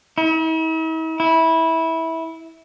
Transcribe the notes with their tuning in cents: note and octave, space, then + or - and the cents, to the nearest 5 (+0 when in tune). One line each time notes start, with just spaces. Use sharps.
E4 -45
E4 -15